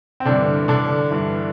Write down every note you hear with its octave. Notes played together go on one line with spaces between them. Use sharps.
C4
G2 D3 E3 D4
D3 D4
G2 E3